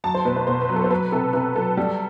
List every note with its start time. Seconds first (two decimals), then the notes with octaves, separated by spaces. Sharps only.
0.04 F#3 A5
0.14 C5
0.25 B2 B4
0.36 C5
0.47 B2 C5
0.61 B4
0.69 F#3
0.76 A4
0.84 C5
0.90 F#3 B4
1.12 C3 A4
1.33 C3 B4
1.56 F#3 A4
1.77 G3